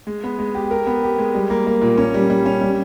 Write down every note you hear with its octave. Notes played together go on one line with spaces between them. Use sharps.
G#3
B3
G#3
G4
A#4
B3
G4
G#3
G3
A#3
A#3
A#2
C#4
G3
G3
C#4
G3